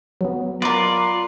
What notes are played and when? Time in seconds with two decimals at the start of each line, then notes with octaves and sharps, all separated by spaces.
0.21 F#3 B3
0.62 F4 A#4 B4 D5 D6